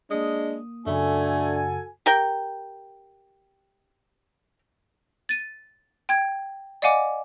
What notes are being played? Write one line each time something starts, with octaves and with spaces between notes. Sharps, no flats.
G#3 A#3 D4 D#6
F#2 C#3 A3 D4 F#4 A4 G#5
G4 A#4 G5
A6 D#7
G5 G#6
D5 D#5 F5 F#5 G#5 D6